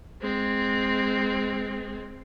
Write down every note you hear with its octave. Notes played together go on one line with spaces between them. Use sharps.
G#3 C4